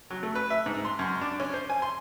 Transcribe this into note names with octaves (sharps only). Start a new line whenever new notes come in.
F#3
A3
B4
E5
G#2
C6
F#2
D4
C#4
C5
G#5
C6